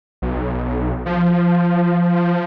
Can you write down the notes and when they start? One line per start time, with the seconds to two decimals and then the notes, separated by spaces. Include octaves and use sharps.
0.22 B1
1.06 F3